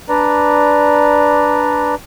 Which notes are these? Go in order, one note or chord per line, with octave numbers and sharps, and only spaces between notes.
D4 B4 D5 A#5